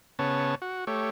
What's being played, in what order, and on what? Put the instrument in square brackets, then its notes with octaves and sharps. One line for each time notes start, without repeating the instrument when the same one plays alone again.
[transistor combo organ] C#3 B3 C#5 A5
F#4
A3 G4 C#5